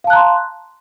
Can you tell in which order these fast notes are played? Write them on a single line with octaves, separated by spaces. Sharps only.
F5 A5 F#6 A#5 C6